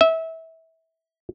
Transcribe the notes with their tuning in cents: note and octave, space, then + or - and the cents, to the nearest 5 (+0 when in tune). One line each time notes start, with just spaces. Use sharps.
E5 -25